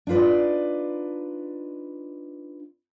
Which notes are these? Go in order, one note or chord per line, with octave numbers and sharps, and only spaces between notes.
D4 D#4 F4 B4 D5